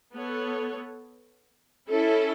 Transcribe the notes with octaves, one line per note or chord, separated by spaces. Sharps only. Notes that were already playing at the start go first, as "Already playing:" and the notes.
B3 A4 C#5
C#4 E4 A4